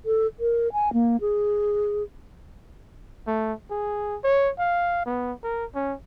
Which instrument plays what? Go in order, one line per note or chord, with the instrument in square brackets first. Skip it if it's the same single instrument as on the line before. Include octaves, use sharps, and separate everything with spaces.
[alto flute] A4
A#4
G#5
A#3
G#4
[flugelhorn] A3
G#4
C#5
F5
B3
A#4
C#4